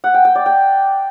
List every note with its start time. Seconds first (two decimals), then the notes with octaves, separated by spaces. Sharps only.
0.04 F#5
0.14 G5
0.25 G5
0.35 D5
0.46 G5